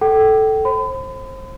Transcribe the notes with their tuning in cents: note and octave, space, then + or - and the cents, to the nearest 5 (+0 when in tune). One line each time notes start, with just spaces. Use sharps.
A4 -5 G5 -30
C5 +30 B5 +40